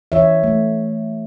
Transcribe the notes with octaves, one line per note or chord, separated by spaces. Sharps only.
E3 C#5 E5
A3